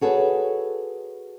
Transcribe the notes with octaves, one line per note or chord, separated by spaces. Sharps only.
F#4 G#4 A4 B4 C#5